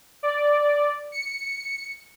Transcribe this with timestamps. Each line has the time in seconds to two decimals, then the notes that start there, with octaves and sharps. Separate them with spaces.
0.23 D5
1.12 C#7